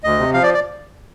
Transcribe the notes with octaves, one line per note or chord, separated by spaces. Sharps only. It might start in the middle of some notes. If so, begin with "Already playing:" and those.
D2 D#5
C3
F3 F5
D5
D5